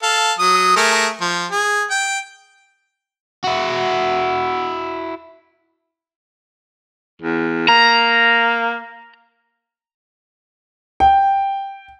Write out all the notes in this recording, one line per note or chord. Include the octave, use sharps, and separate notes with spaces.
A4 F5
F#3 D#6
A3 G#4 A#4
F3
G#4
G5
E4 F#4
E2
A#3 A#5
G5